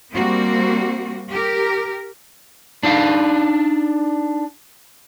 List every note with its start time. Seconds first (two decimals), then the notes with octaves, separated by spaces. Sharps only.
0.13 G3 A#3 C4 F#4
1.32 G4 A#4
2.83 D4 D#4 D5 F5